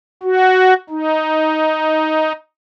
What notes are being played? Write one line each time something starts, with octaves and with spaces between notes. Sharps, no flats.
F#4
D#4